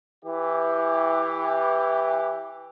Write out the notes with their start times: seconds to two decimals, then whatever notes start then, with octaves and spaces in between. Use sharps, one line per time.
0.25 E3 G4